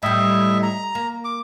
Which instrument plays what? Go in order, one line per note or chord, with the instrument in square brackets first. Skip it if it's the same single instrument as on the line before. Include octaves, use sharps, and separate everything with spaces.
[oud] A2 G3 [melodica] D#5 E5
[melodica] A#5
[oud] A#3
[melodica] D6